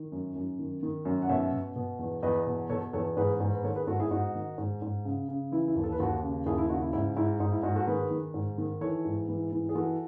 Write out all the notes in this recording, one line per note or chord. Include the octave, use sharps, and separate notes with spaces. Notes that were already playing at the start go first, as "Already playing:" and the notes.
Already playing: D#3
F#2
F#2
D#3
D#3
F#2
F#5
B2 C#5 E5
B2
B2
E2
E2 B4 D#5
B2
B2 A4 C#5
E2 A4 C#5
G#2 G#4 B4
G#2
B4
D#3 A4 C#5
G#4 B4
G#2 F#4 A4
E4 G#4
G#2 D#4 F#4
D#3
G#2
G#2
C#3
C#3
E3 E4
E4
D#2
A4
B4
D#2 F#4 A4
C#3
D#2 E4 G#4
E4
C#3 D#4 F#4
E4
G#2 E4
G#2 E4
G#2 D#4
E4
G#2 D#4 F#4
F#4 A4
D#3 G#4 B4
D#3
G#2
D#3
E3 A4 C#5
G#2
E3
E3
G#4
E3 F#4 A4